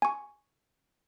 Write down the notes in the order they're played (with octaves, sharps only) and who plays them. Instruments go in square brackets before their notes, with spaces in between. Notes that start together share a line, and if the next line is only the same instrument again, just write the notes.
[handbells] G#5 C#6